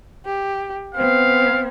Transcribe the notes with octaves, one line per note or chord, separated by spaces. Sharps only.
G4
B3 C4 F5